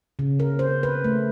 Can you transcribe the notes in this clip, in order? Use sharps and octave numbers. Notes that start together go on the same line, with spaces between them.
C#3
A#4
C5
B4
A3